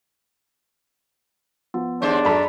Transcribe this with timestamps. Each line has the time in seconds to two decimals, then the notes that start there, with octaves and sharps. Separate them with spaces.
1.74 F3 B3
2.02 D#2 G#3 D4 C5
2.25 F#2 G#3 A4 D5 A#5 B5 B6